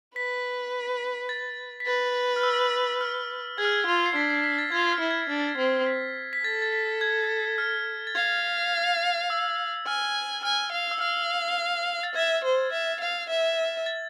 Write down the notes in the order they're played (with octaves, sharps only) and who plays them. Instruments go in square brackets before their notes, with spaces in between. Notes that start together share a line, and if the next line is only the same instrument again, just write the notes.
[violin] B4 [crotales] B6
[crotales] A6
B6
[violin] B4 [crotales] A6
[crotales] F6
E6
F6
[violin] G#4 [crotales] G#6
[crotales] F6
G#6
[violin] F4
[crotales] C7
[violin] D4 [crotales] B6
[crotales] C7
B6
A6
[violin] F4 [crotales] G#6
[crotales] F6
[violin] E4
[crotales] G#6
[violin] D4 [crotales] A6
[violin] C4
[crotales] B6
B6
[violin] A4 [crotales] A6
[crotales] A6
B6
G#6
F6
A6
[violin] F5 [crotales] G#6
[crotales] E6
[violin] G#5 [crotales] F6
[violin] G#5 [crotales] F6
[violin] F5
[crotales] E6
[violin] F5 [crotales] F6
[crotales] A6
[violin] E5 [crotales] G#6
[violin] C5
E5
F5
E5
[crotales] A6